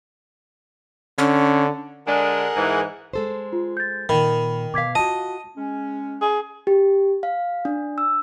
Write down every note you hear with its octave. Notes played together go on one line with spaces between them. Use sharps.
D3 C#4
D3 G#3 D4 G#4 A#4 F#5
G#2 E3
G#3 A4 C5
F4
G6 A6
A#2 D#3 B5
B2 F5 D6 G#6 B6
F4 F#4 D#5 A5
G#3 C#4
G#4
G4
F5
D4
E6